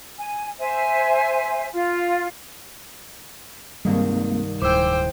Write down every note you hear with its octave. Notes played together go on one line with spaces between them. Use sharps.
G#5
C5 E5 G#5
F4
C2 G2 D#3 G3 G#3 A#3 C4
D1 E4 G#4 C5 G5 D6 E6